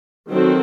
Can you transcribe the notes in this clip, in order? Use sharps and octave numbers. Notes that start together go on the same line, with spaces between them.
D#3 F#3 C4 F#4 A4